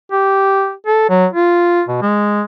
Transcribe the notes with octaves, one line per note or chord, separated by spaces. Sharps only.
G4
A4
F#3
F4
B2
G#3